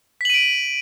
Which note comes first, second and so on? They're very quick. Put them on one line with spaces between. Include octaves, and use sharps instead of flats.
B6 F#7 D#7 D7